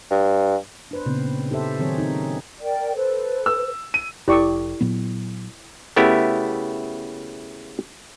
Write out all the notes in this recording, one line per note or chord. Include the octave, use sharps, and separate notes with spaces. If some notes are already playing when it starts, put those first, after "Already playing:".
G2
D4 B4 C5
A#2 C#3 B3 C4
D#4 G4 A4 C5 E5
D#3 F#3 C4 G#4 C5 C#5
C4 D#4
C#4
A#4 D5 G5
A4 B4 C5
E6
D#7
F1 E4 G4 A4 D5 C#6
A#2 F#3 B3
C#3 A3 B3 E4 G4